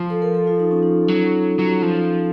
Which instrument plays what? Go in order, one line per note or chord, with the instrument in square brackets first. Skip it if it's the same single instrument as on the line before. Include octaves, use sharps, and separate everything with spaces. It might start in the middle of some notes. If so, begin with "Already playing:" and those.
Already playing: [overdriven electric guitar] F3
[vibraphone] A4
A#4
A4
F4
D#4
C#4
D#4
[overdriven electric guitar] F#3
F#3
F3